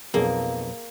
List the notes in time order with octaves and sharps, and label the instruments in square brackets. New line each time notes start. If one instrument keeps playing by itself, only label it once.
[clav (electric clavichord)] B1 F2 [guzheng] A#3 [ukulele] G#4 F5